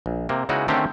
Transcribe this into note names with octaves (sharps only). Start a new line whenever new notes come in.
A#1
C3 A#3
C#3 G#3 B3 D#4 E4 F#4
D3 D#3 A3 C4 C#4 G4